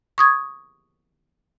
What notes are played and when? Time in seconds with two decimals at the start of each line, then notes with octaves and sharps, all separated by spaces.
0.18 C#6 D#6 G#6